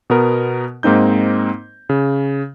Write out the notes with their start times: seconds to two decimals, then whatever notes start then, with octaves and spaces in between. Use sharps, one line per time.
0.10 B2 B3 A#4
0.83 G#2 A#3 C4 D#4 G6
1.89 C#3